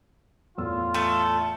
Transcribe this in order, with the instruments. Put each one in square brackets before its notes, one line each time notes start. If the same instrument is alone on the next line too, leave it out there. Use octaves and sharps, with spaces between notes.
[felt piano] E2 A2 E6 [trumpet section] F4
[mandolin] A3 A4